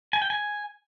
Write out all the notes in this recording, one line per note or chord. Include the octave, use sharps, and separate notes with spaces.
G#5
G5
G#5